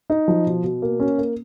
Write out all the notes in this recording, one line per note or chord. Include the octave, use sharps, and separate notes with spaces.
D#4
F3
B2
B2
A#3
C#4
A#3